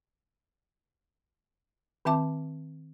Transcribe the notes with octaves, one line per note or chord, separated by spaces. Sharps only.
D#3 C4 E5 A5 D6